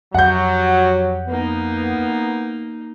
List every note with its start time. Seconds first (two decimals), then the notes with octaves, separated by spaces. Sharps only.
0.14 F2 F#3 G4 F#5 G6
1.29 A#3 B3 D#4